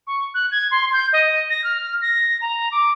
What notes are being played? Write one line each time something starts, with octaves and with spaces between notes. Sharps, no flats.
C#6
F#6
G#6
C6
G6
D#5
A#6
F6
A#6
A#5
D6